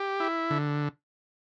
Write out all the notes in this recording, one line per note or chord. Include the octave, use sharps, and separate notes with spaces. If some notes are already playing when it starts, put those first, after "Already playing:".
Already playing: G4
E4
D3